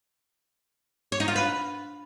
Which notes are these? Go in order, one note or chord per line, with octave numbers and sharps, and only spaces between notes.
C#5
D#4
F4
B4